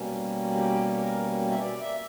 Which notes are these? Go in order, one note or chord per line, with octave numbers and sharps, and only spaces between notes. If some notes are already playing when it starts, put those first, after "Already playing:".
Already playing: B2 G3 A#3 C#4
G4
A#4
E5
D5
E5